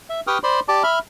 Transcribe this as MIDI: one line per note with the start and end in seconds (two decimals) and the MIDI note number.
0.10 0.21 76
0.27 0.38 67
0.27 0.38 71
0.27 0.38 79
0.27 0.38 85
0.27 0.38 87
0.27 0.38 89
0.44 0.60 72
0.44 0.60 74
0.44 0.60 83
0.44 0.60 84
0.68 0.83 67
0.68 0.83 74
0.68 0.83 81
0.68 0.83 86
0.83 0.99 76
0.83 0.99 83
0.83 0.99 89